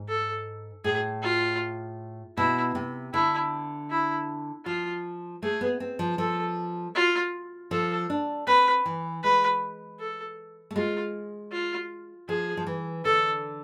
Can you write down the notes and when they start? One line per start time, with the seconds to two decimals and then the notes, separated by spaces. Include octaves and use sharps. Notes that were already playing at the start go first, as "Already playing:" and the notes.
Already playing: G#2
0.08 A4
0.84 A2 G#4
1.23 F4
2.37 B2 E4
2.75 C3
3.14 D3 E4
3.90 E4
4.65 F3 F4
5.43 A3 G#4
5.61 B3
5.80 C4
5.99 F3
6.18 F3 A4
6.95 F4
7.71 F3 A4
8.10 D4
8.47 C4 B4
8.85 E3
9.23 G#3 B4
9.99 A4
10.71 A3
10.76 G#3 F4
11.52 F4
12.29 F3 G#4
12.57 F3
12.67 E3
13.05 D3 A4